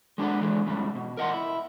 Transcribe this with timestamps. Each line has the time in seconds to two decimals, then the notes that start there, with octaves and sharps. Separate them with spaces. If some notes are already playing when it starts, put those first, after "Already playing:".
0.18 G#3 D4 A4 B4 F#5
0.41 D3 E3 G#3
0.66 E2 G#2 C#3 G3
0.95 B2
1.17 A#4 D#5 F#5 C6
1.33 E4